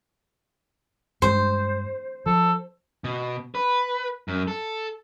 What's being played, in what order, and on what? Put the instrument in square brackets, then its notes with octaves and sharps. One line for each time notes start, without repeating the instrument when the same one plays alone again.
[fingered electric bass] G2 G#3 [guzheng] C5
[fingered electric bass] F3 [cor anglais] A4
[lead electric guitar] B2
B4
F#2
A4